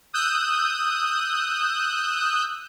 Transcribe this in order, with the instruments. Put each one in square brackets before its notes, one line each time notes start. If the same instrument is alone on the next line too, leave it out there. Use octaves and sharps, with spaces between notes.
[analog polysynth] D#6 E6 F#6 G6